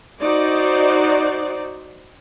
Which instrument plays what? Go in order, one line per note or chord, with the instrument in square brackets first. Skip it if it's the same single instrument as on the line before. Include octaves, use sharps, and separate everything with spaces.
[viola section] D#4 F#4 C5 D5